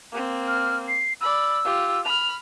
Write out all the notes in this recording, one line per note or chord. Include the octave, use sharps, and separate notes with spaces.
A#3 C4
F6
C7
D5 B5 E6
F4 G4
B5 F6 F7